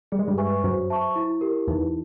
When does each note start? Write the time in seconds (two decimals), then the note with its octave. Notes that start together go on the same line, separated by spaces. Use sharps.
0.12 G3 G#4
0.19 G#3
0.28 G2 G3
0.38 B4 E5 G#5 C#6
0.63 F#2 F#3 C5
0.90 E5 A5 C#6
1.16 E4
1.41 G4 A#4
1.67 E2 E3 D#4